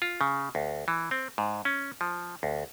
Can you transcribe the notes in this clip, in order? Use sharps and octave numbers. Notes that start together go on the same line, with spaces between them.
F4
C#3
D2
E3
C4
G#2
C#4
F3
D2